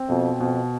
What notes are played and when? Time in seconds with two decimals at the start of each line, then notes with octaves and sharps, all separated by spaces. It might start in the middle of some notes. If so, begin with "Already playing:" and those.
Already playing: C4
0.09 F2 B2
0.40 F2 B2